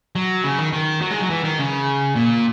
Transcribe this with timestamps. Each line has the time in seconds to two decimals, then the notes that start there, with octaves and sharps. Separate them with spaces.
0.16 F#3
0.44 C#3
0.58 D#3
0.73 D#3
1.01 F#3
1.11 G#3
1.20 F#3
1.30 E3
1.44 D#3
1.59 C#3
2.16 A#2